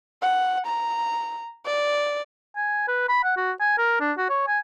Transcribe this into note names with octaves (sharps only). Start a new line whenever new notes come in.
F#5
A#5
D5
G#5
B4
B5
F#5
F#4
G#5
A#4
D4
F#4
C#5
G#5